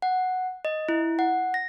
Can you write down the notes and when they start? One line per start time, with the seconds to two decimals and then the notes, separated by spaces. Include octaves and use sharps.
0.02 F#5
0.65 D#5
0.89 E4
1.19 F#5
1.54 A#6